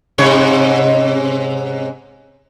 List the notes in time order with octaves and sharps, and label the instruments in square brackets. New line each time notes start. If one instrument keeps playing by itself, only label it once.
[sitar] G#2 C3 C#5